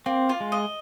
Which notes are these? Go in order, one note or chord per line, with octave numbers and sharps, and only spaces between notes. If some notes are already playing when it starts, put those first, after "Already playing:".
A#3 C4
F4
G#3
D#5